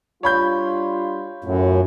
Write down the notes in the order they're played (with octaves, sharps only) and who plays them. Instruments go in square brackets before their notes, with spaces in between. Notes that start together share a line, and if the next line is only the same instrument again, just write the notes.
[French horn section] G3 D4 F4 [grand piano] C#5 B5 G6
[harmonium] F#2 [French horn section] A2 F4